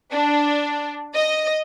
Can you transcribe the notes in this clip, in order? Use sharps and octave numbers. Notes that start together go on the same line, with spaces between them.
D4
D#5